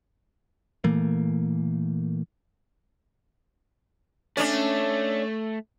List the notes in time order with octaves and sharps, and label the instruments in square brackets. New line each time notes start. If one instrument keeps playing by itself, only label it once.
[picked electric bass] A#2 E3 A3 A#3
[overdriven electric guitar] A3 [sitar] C#4 D4